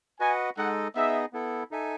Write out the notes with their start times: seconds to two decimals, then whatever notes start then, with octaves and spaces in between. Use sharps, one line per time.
0.20 F#4 B4 D#5 F#5 G#5
0.57 G#3 D#4 A4 D#5 F#5
0.95 B3 D#4 G#4 D#5 E5
1.33 B3 E4 A4
1.71 D#4 A4 E5 G#5